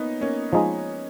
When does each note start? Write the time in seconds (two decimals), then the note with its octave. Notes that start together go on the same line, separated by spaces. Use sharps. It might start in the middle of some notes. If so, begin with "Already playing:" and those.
Already playing: A#3 B3 C#4 D#4
0.21 A#3 C#4
0.53 F3 G#3 D#4 G#4